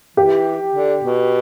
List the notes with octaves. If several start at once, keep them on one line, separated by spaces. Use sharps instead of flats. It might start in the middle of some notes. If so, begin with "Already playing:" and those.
E3 G4
D3
B2